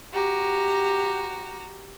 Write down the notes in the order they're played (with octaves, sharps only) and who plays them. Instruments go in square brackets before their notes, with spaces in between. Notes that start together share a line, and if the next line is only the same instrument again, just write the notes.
[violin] F#4 A#5 [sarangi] G4